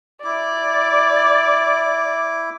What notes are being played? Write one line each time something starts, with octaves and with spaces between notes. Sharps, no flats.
E4 D5 D6